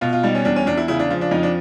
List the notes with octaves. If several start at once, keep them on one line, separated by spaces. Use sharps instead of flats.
B2 F4
F4
G3 D#4
C#4
E2 D4
C#4
E2 D4
E4
C#3 E4
D4
F3
D4
F2 D#4
D4